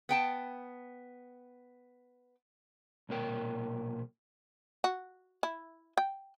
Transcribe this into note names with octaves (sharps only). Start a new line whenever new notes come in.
B3 G5 A5
B1 A#2 A#4 G5
F#4
E4
G5